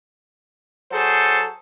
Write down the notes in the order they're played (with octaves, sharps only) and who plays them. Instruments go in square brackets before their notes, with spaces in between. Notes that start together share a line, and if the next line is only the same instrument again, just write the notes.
[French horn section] F#3 G#4 A4 C5